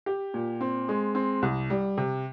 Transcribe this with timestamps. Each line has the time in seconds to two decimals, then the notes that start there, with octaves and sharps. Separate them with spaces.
0.06 G4
0.34 A#2
0.61 C4
0.89 G#3
1.15 C4
1.42 C2
1.70 G3
1.98 C3